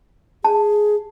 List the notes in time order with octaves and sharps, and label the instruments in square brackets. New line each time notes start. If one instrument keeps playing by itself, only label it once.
[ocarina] G#4 [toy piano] A5